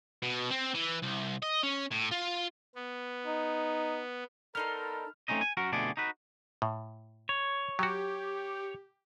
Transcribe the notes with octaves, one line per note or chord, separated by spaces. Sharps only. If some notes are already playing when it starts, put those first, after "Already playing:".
B2
C4
E3
C2
D#5
C#4
A2
F4
B3
D#4
B3 D#4 A4 A#4 D5 C6 F6
A3 C4 C#4 D#4 D#5
G#5
F#2 F#4 A#4
F2 B2 D3 A3 G#4 D5
D#4 F#4 B4
A2
C#5
F#3 F#4 G4